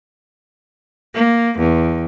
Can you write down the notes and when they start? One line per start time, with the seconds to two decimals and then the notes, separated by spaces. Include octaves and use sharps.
1.14 A#3
1.59 E2